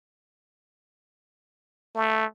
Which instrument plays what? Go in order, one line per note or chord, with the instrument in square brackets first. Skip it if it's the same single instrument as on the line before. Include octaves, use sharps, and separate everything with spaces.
[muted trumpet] A3